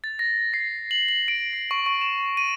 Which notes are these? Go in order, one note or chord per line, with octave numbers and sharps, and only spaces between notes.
A6
A#6
C7
F#7
F#7
D7
C7
C#6
C#6
E7
D#7